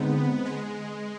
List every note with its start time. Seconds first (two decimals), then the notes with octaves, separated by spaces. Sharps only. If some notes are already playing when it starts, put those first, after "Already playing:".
Already playing: D3 G#3 B3 C4 D#4
0.45 G#3